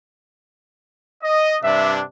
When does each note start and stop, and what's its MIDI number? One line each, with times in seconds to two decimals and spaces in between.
1.23 1.57 75
1.63 2.02 43
1.63 2.02 48
1.63 2.02 62
1.63 1.93 76